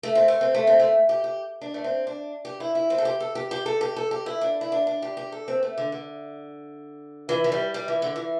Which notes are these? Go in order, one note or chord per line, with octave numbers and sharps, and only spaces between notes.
A3
C4
A3
C4
A3
C4
A3
G4
G4
D4
A3
C4
D4
G4
E4
E4
C4
A4
G4
A4
G4
G4
A4
G4
A4
G4
E4
D4
E4
D4
D4
G4
G4
A4
C4
A3
D3
D3
E3
E3
G3
G3
E3
D3
E3